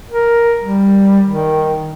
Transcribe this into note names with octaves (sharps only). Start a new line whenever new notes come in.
A#4
G3
D#3